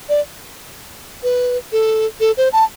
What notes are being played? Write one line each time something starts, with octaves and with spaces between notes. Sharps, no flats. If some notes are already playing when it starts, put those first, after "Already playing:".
D5
B4
A4
A4
C5
A5